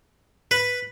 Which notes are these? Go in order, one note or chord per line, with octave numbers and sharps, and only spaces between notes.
B4